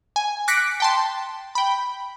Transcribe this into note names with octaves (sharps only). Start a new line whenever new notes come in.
G#5
D6 F#6 A#6 B6 C#7 D7
G5 A5 C6
G5 B5